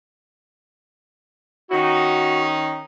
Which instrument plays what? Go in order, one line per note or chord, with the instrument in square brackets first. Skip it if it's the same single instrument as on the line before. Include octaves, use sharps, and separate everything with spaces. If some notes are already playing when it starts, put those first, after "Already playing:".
[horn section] D#3 C#4 D#4 [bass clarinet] F#4